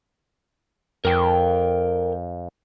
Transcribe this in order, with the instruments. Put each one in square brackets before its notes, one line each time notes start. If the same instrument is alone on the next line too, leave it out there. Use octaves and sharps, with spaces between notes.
[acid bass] F2 [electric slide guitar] A#4 G5